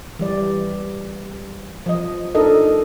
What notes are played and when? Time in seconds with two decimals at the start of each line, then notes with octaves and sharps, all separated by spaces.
0.19 E3 G3 D5
1.86 F3 D#5
2.35 D4 D#4 A4 A#4 D#5